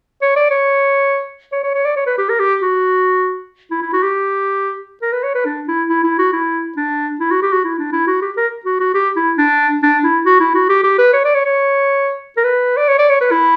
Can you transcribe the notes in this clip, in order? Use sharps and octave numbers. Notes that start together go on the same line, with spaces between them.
C#5
D5
C#5
C#5
C#5
C#5
D5
C#5
B4
G4
A#4
G4
F#4
E4
E4
F#4
G4
A#4
B4
C#5
B4
D4
E4
E4
E4
F#4
E4
D4
E4
F#4
G4
F#4
E4
D4
E4
F#4
G4
A#4
F#4
F#4
G4
E4
D4
D4
E4
F#4
E4
F#4
G4
G4
B4
C#5
D5
C#5
C#5
A#4
B4
D5
C#5
D5
C#5
B4
E4